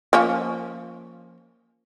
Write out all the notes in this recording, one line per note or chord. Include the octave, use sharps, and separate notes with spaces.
F3 A#3 C#4